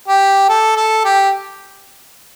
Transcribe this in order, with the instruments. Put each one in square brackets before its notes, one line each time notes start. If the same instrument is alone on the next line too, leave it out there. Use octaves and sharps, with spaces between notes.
[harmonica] G4
A4
A4
G4